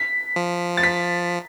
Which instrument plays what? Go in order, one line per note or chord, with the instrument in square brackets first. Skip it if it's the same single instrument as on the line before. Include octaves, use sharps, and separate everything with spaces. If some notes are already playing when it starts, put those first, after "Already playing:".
Already playing: [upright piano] B6
[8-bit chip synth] F3
[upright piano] A6
B6